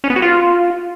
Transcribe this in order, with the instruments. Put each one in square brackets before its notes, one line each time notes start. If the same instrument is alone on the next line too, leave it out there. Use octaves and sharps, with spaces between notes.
[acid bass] C#4
B3
F#4
F4